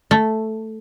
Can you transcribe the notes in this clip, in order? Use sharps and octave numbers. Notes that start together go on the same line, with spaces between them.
A3